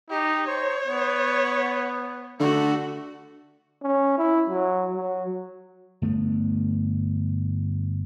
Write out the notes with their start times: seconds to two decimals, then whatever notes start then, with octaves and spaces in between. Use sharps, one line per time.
0.10 D#4 G4
0.47 C5 C#5
0.87 B3
2.40 D3 A3 F#4
3.82 C#4
4.18 E4
4.49 F#3
4.95 F#3
6.02 G1 A3 B3